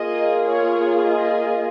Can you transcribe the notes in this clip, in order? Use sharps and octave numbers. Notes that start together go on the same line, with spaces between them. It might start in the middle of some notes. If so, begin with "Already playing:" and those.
Already playing: A#3 F4 G#4 D#5
C#5
D#5